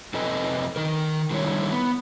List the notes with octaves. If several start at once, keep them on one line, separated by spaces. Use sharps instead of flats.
F2 C3 A4 B4 D#5 G#5
D#3 A#4
D3 D#3 G3 E4 C#5
B3